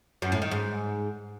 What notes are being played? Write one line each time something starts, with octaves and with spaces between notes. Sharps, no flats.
F#2
A2
D#3
G#2